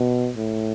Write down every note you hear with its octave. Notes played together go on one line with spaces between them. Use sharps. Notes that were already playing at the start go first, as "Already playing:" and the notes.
Already playing: B2
A2